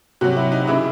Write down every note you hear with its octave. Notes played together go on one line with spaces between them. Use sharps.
C3 F#3 F#4
E4
D#4
C#3 E3 E4